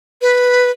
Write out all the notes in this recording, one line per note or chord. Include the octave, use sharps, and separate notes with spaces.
B4